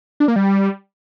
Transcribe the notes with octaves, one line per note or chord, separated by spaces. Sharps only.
D4
A#3
G3